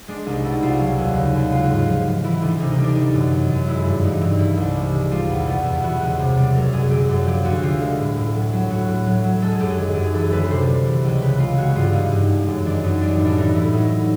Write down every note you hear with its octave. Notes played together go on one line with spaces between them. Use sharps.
G#3 D4
C2 D#4
B2 E4
C2 F4
F#3
D#2
C#3
D#2
G#3 F4
F#4
G#2 F4
F3
G#2
E3 E4
D2
C3 D#4
D#4
G3
D4
G3 D#4
F#2
D#3
F#2
G#3 E4
G2
E3 D#4
G2
D#3 E4
C2
C3
G#3
G3 F4
E2
B2
E2
E3 F#4
C#2
C3
G3
F#3 A#4
F#2 G#4
D3 G4
F#2
F3 G4
D2 F#4
D3 F4
G#3
A2
A2
F#3
F#3
A2 F#4
A2
F#3
F#3
G#3 A4
G#4
F#2 G4
G#4
D#3
F#2 G4
G#4
E3 A4
D2 B4
C3 C5
G3
E3
C#2
C#3 B4
G#3 F4
G#3 F#4
G2 F4
E3 D#4
G2
G#3
F#2
D#3 D4
F#2 D#4
G3 D4
D#4
A2
D4
E3 D#4
A2 E4
F#3 D#4